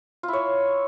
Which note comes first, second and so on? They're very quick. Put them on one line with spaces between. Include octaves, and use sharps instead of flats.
F4 E4 C#5